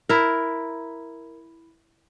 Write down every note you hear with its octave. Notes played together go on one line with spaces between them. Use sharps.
E4 A#4